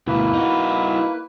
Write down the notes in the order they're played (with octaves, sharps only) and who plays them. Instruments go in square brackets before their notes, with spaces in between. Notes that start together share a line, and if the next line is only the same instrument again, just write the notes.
[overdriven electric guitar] D2 B2 [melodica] A#3 B4 [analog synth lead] E4
[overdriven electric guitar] D#4 F#4